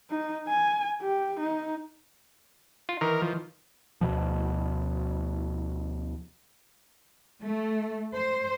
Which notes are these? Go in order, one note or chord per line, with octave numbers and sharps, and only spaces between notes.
D#4
G#5
G4
D#4
F4
D#3 E3 A#4
F3
D2 B2 F3
A3
C5